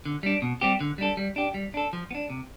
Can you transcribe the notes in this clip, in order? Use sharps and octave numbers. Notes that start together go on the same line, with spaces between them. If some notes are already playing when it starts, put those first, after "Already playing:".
D3
G3 D4
B2
G3 C4 G4
D3
G3 D4 A4
G3
D4 G4
G3
D4 A4
F3
B3
D4
C3